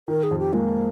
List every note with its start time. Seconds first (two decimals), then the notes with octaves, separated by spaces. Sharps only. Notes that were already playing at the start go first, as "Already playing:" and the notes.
0.08 D#3 A#4
0.23 G#4
0.31 F2
0.39 G4
0.53 G#3 A#3